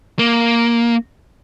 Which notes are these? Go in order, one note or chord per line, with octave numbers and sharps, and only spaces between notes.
A#3